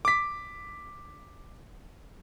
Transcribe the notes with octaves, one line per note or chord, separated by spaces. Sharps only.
D6 B6